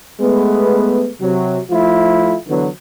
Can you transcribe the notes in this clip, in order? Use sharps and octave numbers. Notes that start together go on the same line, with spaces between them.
G#3 A3 B3
C3 F#3
F3 A3 E4 F4
D3 E3 F#3 B3